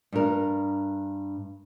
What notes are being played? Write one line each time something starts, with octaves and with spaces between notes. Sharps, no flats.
G2 A#4